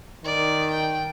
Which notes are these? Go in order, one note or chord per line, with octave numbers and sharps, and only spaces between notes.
D#3 D5
G5